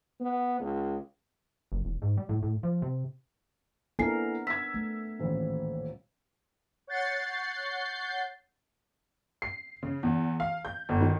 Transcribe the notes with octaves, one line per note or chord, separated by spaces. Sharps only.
B3
C#2
F#1
E1
G#2
G3
A2
A2
F3
C3
A#3 B3 D4 E4 A4 A#4 G#5 C7
E6 G#6 B6
A3
D#1 A1
C#5 F#5 G6 A6 C7
C7
C#3
E2
F5
G6
G1
D#3